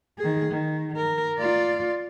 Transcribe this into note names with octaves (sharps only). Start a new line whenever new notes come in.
D#3 G#4
D#3
A#4
F4 D5